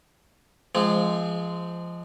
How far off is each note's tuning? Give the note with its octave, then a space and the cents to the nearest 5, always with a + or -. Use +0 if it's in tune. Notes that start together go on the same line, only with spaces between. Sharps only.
F3 -20 G#3 +0 C4 -20